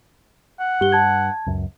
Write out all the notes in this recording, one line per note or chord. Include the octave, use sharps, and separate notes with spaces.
F#5
G2 G4 G7
A5 G#6
C#2 F#2